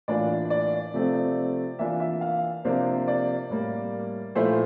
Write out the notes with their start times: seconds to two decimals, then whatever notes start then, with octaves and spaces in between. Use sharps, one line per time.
0.08 A2 E3 A#3 D4 F4 D5
0.50 D5
0.94 C3 F3 A3 C4
1.79 E3 A#3 D4 F4 E5
2.00 E5
2.21 F5
2.65 C3 F3 A#3 D4 C5
3.08 D5
3.50 A2 G3 A#3
4.35 A#2 F3 A3 E4 C5